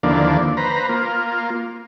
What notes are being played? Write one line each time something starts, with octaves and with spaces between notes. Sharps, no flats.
D#2 D3 E3 F3 A#3 D4
B4 C5 A#5
A#3 F4